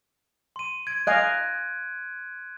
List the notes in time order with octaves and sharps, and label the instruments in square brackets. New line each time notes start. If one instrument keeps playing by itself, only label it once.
[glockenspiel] C6 D#7
G#6 D7
[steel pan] D#5 F5 G#5 [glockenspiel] F#6 G#6 D7